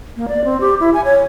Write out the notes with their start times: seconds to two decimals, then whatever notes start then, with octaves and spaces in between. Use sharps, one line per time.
0.17 A#3
0.28 D5
0.45 C4
0.60 G4
0.80 E4
0.94 G#5
1.05 C#5